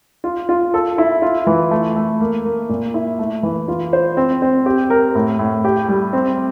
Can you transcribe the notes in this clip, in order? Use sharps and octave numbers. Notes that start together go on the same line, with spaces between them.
F4
F4
A4
E4
F4
E3
A3
A3
A#3
A#3
A#2
E4
A3
E3
F4
C5
C4
C4
G4
A#4
A2
A2
G4
G3
C4